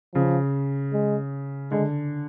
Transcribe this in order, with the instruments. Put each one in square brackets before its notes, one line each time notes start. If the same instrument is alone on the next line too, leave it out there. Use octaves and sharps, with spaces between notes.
[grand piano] C#3 [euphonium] F3
[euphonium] G#3
[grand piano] D3 [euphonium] G#3